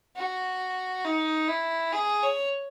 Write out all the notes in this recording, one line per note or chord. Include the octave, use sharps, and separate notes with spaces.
F#4
D#4
E4
G#4
C#5